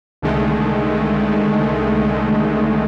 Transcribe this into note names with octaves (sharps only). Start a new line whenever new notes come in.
C2 D3 D#3 G#3 A3